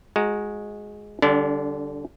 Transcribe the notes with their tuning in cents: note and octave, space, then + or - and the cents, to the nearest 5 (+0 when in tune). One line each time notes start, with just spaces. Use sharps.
G#3 +0 F#4 -25 A#5 +0
D3 +0 G3 +0 D4 -40